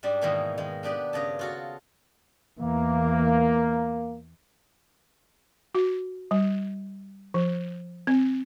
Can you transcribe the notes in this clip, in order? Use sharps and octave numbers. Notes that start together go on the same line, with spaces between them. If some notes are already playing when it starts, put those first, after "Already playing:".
G#2 G3 D4
G#2 B2 D#3 E3 G#3 A#3
D#3 G#3
B3 D4 G4 B4
G2 C#3 D#5 A5
F4 F#4 A4
E2 E3 A#3
F#4
G3
F3
C4